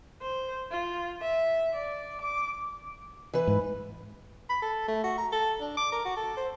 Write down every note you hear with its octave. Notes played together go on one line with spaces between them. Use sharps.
C5
F4
E5
D5
D6
E3 B4
G#2
B5
A4
A3
F#4
A#5
A4
D4
D6
A#4
F#4
A4
C5